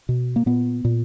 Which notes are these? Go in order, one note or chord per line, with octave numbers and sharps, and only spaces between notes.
B2
A#3
A#2 B3
A#2